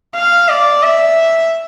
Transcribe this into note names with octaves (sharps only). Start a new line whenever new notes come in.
F5
D5
E5